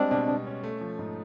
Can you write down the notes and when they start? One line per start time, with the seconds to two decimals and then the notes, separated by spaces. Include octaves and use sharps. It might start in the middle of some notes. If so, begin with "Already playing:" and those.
Already playing: G3 G#3 C4 D4
0.11 B2
0.29 B2
0.47 C#4
0.63 A3
0.81 F3
0.99 G#2